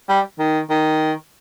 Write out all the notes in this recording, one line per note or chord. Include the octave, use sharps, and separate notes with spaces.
G3
D#3
D#3